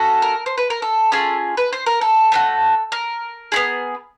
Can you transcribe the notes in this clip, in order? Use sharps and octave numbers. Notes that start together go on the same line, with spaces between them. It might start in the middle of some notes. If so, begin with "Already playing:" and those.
Already playing: C#4 F#4 A4
A#4
C5
B4
A#4
A4
C#4 F4 G#4
B4
C5
A#4
A4
A3 D4 F#4
A#4
B3 E4 G#4